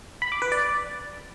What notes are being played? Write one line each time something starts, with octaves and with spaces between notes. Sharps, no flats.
B5
D6
B4
D5